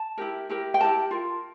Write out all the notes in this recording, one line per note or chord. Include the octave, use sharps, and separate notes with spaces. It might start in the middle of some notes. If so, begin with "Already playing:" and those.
Already playing: A5
E4 G4 A#4
E4 G4 A#4
G5
E4 G4 A#4 A5
F4 A#4